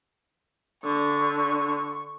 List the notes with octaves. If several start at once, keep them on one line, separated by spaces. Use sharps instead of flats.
D3 C#6